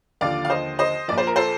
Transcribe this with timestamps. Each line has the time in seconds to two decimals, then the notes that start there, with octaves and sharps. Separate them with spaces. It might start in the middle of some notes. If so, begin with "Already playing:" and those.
0.21 D#2 D3 F3 D5 F5
0.45 F5
0.50 C5 D#5
0.79 C5 D#5
1.08 A#1 A#2 F3 D5
1.18 C5
1.27 A#4
1.36 A4 C5